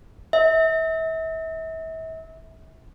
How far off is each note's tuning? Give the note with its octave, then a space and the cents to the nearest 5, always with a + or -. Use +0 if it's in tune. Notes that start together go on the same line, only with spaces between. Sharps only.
E5 -35